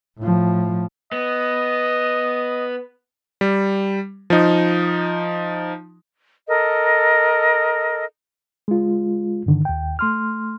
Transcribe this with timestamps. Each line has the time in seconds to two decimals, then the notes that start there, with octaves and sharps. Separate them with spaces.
0.19 A2 F3
1.12 B3 D#5
3.41 G3
4.30 F3 D#4
6.48 A4 A#4 D#5
8.68 G#3 F4
9.46 G2 D3 D#3
9.65 D#2 G5
9.99 A3 C6 F6